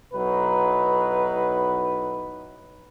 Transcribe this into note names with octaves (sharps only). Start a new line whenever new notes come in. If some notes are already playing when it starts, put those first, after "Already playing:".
B1 F#3 D#4 E4 B4